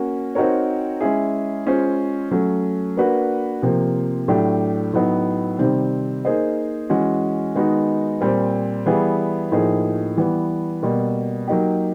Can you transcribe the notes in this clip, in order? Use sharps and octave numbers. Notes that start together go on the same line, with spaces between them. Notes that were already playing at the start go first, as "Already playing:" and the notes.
Already playing: A#3 C#4 F#4
C4 D#4 F#4 A#4 C#5
G#3 C#4 E4 G#4
G#3 C#4 F4 G#4 C5
F#3 A3 C#4
A#3 D4 F#4 B4
C3 F3 A#3
A2 F#3 A3 D4 G4
A2 F#3 B3 D#4
C3 D#3 G3 C4
A#3 D#4 G#4 C5 D#5
E3 G#3 C#4 F#4
D#3 G#3 B3 D#4 F#4
A#2 G3 C4
E3 G3 B3 E4 G#4
A2 F3 A#3 D#4 G#4
E3 G3 B3
B2 G3 A#3
F#3 A#3 D#4 G4